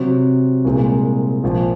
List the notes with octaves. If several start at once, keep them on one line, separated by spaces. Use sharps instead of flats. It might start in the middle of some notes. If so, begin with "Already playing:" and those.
Already playing: C3 F#3 C4
C2 A#2 G#3 C4
A#1 A#2 F3